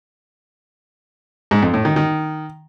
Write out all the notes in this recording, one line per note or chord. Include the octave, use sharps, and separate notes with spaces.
G#2
F2
A2
D#3
D#3